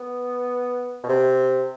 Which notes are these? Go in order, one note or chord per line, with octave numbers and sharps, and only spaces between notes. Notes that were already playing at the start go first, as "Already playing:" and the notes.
Already playing: B3
B2
C3